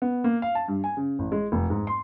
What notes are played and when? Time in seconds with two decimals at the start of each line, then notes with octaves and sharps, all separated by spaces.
0.02 B3
0.24 A#3
0.42 F5
0.55 A5
0.68 G2
0.84 G#5
0.97 C#3
1.19 A1
1.32 G#3
1.52 F1
1.70 G#2
1.87 C6